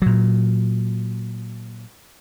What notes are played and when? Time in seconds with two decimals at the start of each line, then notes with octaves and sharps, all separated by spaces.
0.02 A#2 F#3